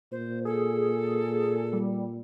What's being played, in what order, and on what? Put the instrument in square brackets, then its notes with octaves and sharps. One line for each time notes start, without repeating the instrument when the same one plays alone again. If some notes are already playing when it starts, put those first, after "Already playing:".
[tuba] A#2 [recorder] C5
[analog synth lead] G#4 [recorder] A4
[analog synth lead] G3